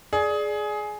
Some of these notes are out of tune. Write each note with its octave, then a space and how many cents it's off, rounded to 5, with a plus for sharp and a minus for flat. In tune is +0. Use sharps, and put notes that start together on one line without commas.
G#4 +15 D5 +0